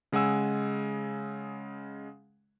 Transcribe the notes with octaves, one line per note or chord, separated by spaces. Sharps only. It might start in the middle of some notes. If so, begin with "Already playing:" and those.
C#3 G#3 F#5 G#5 E6